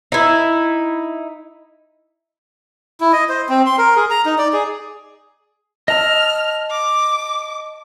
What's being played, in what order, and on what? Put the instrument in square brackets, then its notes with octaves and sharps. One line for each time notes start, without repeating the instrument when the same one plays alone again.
[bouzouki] D#4 E4
[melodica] E4
D#5
C5
C4
C6
A#4
G#4
A#5
D#4
D5
G#4
[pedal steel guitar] D#5 A5 E6 [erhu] F6
[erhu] D6